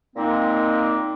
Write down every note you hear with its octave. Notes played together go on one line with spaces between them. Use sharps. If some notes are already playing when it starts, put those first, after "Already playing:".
A#2 G#3 A#3 C4 D#4